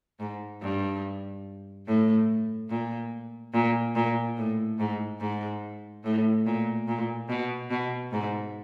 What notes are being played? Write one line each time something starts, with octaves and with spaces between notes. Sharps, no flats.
G#2
G2
A2
A#2
A#2
A#2
A2
G#2
G#2
A2
A#2
A#2
B2
B2
G#2